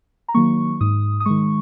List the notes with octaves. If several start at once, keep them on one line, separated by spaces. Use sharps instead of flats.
A#5
D#3 F#3 A#3 C#6
G#2 D#6
D#6
D#3 G#3 C#6